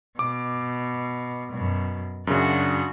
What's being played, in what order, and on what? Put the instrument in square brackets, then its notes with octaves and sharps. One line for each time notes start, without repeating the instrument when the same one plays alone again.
[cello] B2 [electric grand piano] D6
[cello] F#2 B2
[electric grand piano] F#2 C#3 [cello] D4 F#4